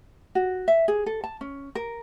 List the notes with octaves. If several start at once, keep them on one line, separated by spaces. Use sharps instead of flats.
F#4
E5
G#4
A4
A5
C#4
A#4